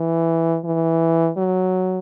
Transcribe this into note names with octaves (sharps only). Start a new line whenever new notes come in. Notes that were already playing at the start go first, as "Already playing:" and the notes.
Already playing: E3
E3
F#3